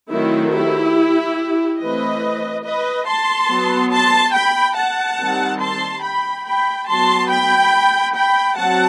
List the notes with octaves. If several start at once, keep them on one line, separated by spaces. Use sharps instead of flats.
D#3 F#3 A3 C4 E4
E4 G4
E3 A3 C4 B4 D#5
B4 D#5
A5 C6
F#3 B3
A5 C6
G5 B5
F#5 A5
D#3 G3 C4
A5 C6
G5 B5
G5 B5
F#3 B3 A5 C6
G5 B5
G5 B5
F#3 C4 F#5 A5